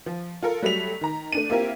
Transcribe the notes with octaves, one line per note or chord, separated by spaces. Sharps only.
F3
F4 A4 A#4
F#3 G3 A3 B6 F7
D#3 A#5
A3 D4 D#7
A#3 C4 E4 F4 G4 A#4